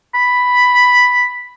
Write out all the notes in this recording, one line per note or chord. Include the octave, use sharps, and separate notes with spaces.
B5